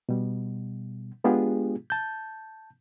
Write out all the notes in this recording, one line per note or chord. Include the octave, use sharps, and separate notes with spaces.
B2 G3
G#3 B3 D4 F4 G4 G#4
A5 G6